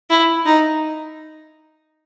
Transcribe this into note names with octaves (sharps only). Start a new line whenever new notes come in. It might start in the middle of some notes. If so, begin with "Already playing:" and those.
E4
D#4